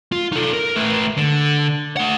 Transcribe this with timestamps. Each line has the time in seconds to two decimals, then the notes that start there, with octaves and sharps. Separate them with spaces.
0.12 F4
0.32 D#4 A4
0.53 A#4
0.76 A3 B4
1.18 D3
1.97 A3 F#5